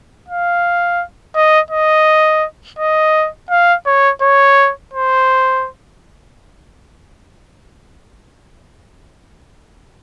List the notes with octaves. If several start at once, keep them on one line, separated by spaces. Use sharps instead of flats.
F5
D#5
D#5
D#5
F5
C#5
C#5
C5